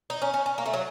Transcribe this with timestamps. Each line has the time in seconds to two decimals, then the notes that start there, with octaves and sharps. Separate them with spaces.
0.10 D#4
0.22 C#4
0.34 C#4
0.46 C#4
0.58 A#3
0.66 A3
0.73 F#3